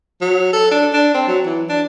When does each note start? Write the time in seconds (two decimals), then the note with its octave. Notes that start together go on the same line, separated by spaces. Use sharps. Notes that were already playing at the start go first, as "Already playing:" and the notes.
0.21 F#3
0.53 A4
0.71 D4
0.93 D4
1.14 C4
1.28 F#3
1.46 E3
1.69 D4